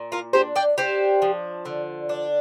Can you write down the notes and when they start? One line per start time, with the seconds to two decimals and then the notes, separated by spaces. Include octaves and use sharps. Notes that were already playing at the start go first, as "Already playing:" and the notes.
Already playing: A#2
0.12 F4 A#4
0.33 D4 G4 C5
0.56 D5 G5
0.77 D4 G4 C5
1.22 F3
1.65 D3
2.09 D4